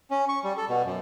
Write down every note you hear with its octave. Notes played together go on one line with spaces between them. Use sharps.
C#4
C#6
G3
A4
B2
F#2